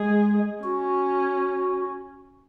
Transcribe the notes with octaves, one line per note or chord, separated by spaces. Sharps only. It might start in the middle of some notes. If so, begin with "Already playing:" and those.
Already playing: G#3 G#4
C#4 F#4